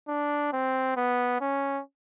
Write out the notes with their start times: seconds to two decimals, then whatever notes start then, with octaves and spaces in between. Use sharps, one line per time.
0.08 D4
0.53 C4
0.97 B3
1.41 C#4